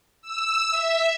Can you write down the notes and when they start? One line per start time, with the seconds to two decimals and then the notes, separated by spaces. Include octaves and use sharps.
0.22 E6
0.71 E5